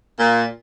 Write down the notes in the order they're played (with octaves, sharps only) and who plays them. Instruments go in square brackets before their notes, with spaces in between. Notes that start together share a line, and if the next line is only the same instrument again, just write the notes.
[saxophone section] A#2